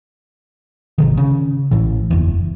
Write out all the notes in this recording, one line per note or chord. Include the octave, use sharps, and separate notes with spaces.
G#1 C3 D#3
C#3
A1 A2 E3
F#1 E2